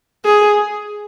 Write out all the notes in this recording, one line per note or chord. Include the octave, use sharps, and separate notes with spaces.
G#4